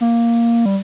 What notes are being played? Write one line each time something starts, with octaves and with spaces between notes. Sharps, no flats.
A#3
G3